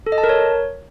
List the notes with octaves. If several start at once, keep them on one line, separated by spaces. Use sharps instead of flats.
A4
D#5
A5
A#4
C#5